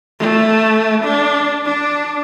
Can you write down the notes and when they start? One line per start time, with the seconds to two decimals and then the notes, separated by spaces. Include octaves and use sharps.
0.20 A3
1.04 D4
1.66 D4